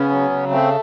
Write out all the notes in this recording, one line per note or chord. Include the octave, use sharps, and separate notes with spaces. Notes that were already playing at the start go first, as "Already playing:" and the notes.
Already playing: C#3 B3 C#4
F#3
C#3
A3 C4